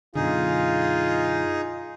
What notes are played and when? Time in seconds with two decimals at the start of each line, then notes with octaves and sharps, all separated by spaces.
0.15 F#2 B2 D3 D#4 F4 G#4